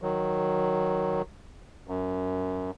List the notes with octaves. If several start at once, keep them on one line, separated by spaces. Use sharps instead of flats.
D#3 F#3
F#2